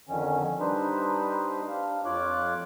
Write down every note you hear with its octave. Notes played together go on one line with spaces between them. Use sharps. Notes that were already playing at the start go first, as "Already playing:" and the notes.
F2 D3 D#3 C#4
G3 D4 D#4 B4 C5
D4 F5
F2 F4 C#5 D6 F#6